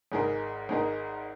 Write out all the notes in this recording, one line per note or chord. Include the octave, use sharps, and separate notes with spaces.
G#1 G#2 G#3 D#4 A#4
G#1 G#2 G#3 D#4 A#4